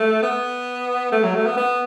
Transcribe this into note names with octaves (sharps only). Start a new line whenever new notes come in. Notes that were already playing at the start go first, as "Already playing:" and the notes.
Already playing: A3
B3
A3
F#3
A3
B3
B3